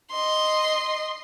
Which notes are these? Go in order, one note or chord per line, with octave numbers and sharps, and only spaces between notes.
D#5 C6